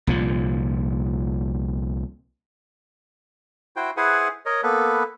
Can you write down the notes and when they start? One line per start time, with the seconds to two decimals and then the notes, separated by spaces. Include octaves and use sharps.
0.07 C2 A#2 F3
3.76 E4 F#4 C5 G5
3.97 E4 G#4 B4 C5 F#5 G#5
4.46 A#4 C#5 D#5
4.63 A#3 B3 A4 B4